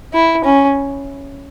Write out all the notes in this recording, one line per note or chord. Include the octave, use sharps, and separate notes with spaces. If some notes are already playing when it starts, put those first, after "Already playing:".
E4
C#4